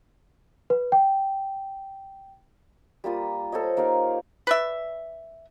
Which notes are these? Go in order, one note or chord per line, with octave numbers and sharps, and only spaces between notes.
B4
G5
G3 A#3 F4 D#6
A4 C5 C#5 D#5
A#3 D#4 G4 F5
B4 D5 E5